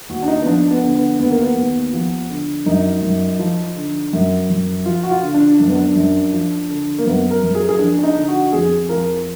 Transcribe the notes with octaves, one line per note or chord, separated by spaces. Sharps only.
D#2 F#4
D4
D#4
B3
F3 D4
B3
D3
B3
D#2 B3
A#3
B3
D#2
F3
D3
F#2 D#4
F#2
F3
D3
F#2
F#2
F3 F4
F#4
F4
D3
D4
F#2 D4
B3
D4
F#2
F3
D3
A#3
F#2 B3
A#4
F#2
G#4
A#4
G#4
F3 D4
D4
D#4
D3
F#4
F2 G#4
F3 A#4